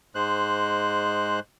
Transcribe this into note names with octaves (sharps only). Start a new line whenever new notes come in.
G#2 G#3 C5 F#6